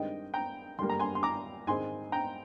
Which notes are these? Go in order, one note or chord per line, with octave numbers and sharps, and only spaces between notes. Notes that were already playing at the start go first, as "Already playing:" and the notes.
Already playing: G2 D#3 G#3 C4 D#5 G5
G5 A#5
G2 D3 G3 A#3 C6
A#5
G#5 C6
C6
A#5 D6
G#2 D#3 G#3 C4 G#5 C6
G5 A#5